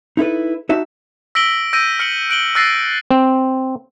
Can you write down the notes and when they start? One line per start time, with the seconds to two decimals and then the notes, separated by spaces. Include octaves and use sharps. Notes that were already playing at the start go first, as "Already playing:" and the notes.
0.17 D#4 E4 A4 B4
0.69 D#4 F#4 E5 A5
1.35 E6 A#6 B6 D7 F#7 G7
1.73 E6 G6 A#6 D7 D#7
1.99 F6 C#7 D7 F#7
2.30 F#6 D7 F#7 G7
2.55 E6 F#6 A6 A#6 C7 D#7
3.11 C4